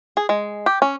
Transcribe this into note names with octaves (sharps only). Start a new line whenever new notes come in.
G#4
G#3
G4
C#4